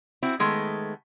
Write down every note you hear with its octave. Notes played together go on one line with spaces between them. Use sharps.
C4 E4 F#4
D#3 G#3 A3 B3